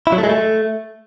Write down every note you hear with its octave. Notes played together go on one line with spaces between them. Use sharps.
E4
F#3
A3
G#3
A3